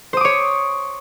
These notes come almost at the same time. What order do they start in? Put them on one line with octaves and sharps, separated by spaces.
C5 D#6 D6 C#5